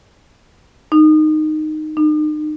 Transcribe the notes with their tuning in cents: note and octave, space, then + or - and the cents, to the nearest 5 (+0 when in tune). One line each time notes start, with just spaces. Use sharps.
D#4 -10
D#4 -35